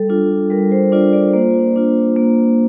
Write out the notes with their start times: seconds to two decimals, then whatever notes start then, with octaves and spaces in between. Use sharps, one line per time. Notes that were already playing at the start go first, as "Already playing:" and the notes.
Already playing: G3 A4
0.09 D4 F4
0.50 G3 A#4
0.72 C5
0.92 D4 F4 D5
1.13 D5
1.33 A#3 C5
1.76 D4 F4
2.16 A#3